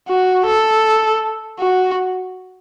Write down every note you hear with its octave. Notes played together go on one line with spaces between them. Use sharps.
F#4
A4
F#4